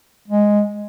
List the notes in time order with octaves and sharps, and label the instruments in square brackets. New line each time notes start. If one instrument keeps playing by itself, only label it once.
[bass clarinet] G#3